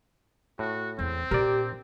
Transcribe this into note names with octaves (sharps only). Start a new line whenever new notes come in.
A2 F#4
E2 C4
A#2 D4 G4 A#4 D5